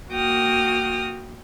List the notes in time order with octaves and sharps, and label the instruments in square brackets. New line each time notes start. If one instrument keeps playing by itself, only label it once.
[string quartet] A#3 F#4 G5 D#6 F6